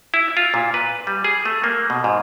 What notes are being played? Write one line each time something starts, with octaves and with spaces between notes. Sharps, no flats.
E4
F4
A#2
B4
G3
G#4
A3
A#3
B2
G#2